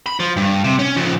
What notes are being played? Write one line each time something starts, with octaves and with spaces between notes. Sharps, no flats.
B5
F3
G2
C3
C#4
C#3 F3